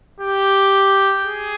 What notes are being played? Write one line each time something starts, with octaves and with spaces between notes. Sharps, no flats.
G4
G#4